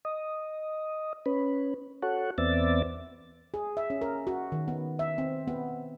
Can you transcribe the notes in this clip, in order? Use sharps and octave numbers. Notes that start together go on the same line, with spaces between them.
D#5
C#4 B4
F#4 A4 C#5 F#5
E2 B3 C4 D5 E5 A6
G#4
E5
C#4
A#4
F#4
D#3
B3
E5
C4
B3